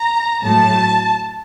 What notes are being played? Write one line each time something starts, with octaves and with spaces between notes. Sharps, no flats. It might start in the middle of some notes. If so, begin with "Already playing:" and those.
Already playing: A#5
A2 F#3 A3 A5